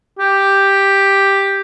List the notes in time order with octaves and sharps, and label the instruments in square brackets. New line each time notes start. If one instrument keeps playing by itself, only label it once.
[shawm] G4